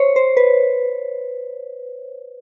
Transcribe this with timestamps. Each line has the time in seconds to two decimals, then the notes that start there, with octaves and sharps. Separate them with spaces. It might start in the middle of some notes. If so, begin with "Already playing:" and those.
Already playing: C5 C#5
0.16 C5
0.37 B4